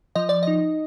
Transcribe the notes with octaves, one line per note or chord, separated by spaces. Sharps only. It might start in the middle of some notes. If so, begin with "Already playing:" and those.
F3 D#5
D5
D#4 D#5